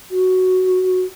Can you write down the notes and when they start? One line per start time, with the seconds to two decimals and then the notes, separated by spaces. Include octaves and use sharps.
0.10 F#4